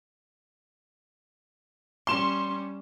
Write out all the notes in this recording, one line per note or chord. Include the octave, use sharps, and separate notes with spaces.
G3 C#4 C6 E7